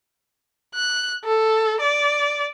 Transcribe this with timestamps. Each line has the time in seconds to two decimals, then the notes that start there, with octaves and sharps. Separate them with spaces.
0.75 F#6
1.25 A4
1.81 D5